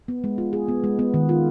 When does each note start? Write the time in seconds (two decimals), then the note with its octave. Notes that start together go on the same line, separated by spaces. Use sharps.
0.08 B3
0.24 G#3
0.38 F4
0.53 G#4
0.68 B3
0.84 G#3
0.99 B3
1.14 D#3
1.29 F4